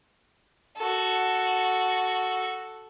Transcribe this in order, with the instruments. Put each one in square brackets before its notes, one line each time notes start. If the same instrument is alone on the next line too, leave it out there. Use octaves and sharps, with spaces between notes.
[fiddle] F#4 A4